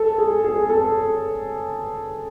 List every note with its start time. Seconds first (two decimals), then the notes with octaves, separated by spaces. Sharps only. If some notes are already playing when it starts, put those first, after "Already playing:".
Already playing: A4
0.18 G#4
0.44 G#4
0.70 A4